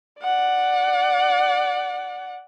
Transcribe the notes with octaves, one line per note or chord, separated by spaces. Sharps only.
D5 F#5